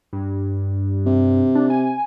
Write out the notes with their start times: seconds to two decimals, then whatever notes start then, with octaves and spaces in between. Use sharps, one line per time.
0.13 G2
1.06 C3
1.55 D4
1.70 G#5